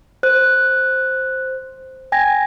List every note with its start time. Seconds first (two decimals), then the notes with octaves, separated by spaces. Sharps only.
0.23 C5 F#6
2.12 G5 G#5 G#6 A#6